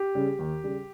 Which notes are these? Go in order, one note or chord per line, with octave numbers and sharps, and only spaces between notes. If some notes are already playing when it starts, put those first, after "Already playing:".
Already playing: G4
C#3 G3
D#2
C#3 G3